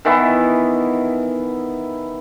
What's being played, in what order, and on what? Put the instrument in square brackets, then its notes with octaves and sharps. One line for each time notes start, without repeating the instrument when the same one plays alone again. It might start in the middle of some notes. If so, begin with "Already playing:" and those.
[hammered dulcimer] D#3 E3 B3 E4